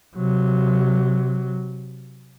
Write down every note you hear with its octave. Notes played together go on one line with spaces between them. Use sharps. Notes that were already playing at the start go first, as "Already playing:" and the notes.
C3 F#3